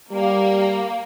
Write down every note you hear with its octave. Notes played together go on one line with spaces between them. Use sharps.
G3 A#3